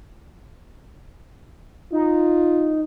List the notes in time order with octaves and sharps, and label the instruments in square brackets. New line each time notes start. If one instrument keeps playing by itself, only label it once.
[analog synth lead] D#4 [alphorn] F4